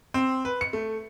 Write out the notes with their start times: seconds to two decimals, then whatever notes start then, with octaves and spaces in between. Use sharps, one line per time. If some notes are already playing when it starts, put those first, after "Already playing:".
0.14 C4
0.45 B4
0.61 C#7
0.73 A3